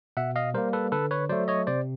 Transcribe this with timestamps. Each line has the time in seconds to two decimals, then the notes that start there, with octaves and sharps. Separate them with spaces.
0.17 B2 E5 F#5
0.36 D#5 F5
0.54 G3 A#3 A#4 C5
0.73 A4 B4
0.92 D3 A4 B4
1.11 B4 C#5
1.29 F#3 A3 C5 D5
1.48 C#5 D#5
1.67 C3 C5 D5